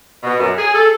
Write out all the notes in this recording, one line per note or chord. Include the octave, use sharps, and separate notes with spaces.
B2
F#2
G#4
A4